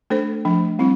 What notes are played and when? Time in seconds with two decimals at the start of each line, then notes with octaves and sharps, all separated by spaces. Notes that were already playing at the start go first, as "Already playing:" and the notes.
0.10 A3 D4 A4 C5
0.45 F3 A3 D4
0.79 G3 C4 E4